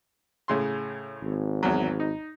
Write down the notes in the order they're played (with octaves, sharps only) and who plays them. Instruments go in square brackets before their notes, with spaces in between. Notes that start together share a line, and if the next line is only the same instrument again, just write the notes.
[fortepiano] A2 C#3 C6
[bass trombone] G#1
[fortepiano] E2 F#3
D#4